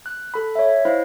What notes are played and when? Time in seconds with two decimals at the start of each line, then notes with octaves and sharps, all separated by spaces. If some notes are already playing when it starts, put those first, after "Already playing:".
0.06 F#6
0.34 A4 B5
0.55 C#5 E5
0.85 E4 C5 D#5 F5